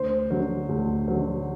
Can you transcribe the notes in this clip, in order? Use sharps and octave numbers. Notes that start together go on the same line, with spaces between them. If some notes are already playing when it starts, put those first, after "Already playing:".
Already playing: D2 C5
D3 F#3
D2
D3 F#3